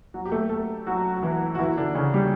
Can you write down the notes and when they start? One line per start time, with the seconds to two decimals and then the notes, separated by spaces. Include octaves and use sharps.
0.14 F#3 F#4
0.25 G4
0.32 A3 A4
0.49 A3 A4
0.86 F#3 F#4
1.16 F#4
1.22 E3 E4
1.55 F#4
1.59 E3 E4
1.78 D3 D4
1.95 C#3 C#4
2.14 G3 G4